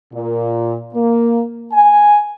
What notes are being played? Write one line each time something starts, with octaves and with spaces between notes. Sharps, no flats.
A#2
A#3
G#5